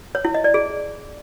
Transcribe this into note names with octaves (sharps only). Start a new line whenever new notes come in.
C#5
E4
D#5
D5
G#4